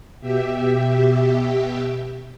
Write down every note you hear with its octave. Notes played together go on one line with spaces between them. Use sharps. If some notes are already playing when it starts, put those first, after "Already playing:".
B2 G4 E5